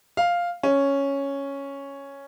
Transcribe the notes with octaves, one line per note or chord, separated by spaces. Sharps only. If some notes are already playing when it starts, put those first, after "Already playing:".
F5
C#4